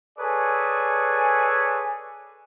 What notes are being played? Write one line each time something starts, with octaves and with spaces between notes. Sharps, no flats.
G#4 A4 B4 C#5 D5 G#5